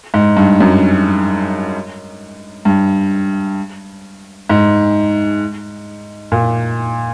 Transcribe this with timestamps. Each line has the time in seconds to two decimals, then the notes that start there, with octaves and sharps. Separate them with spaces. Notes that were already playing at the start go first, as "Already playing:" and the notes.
0.14 G#2
0.37 G2
0.60 F#2
2.65 G2
4.49 G#2
6.32 A#2